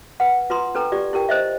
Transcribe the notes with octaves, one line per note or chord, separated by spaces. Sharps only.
B4 F#5
F4 B4 A#5 C6 D#6
D4 A4 B4 G5 A#5
F4 G4 D5
E4 G4 A#4 G5
C5 D#5 E5